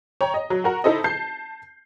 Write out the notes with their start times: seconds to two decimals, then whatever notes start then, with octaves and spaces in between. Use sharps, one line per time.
0.21 C#5 G5 A#5
0.34 D#5
0.50 F#3
0.64 F#4 A#4 F#5
0.84 D#4 E4 A4 C5 D#5
1.04 A5 G6 C7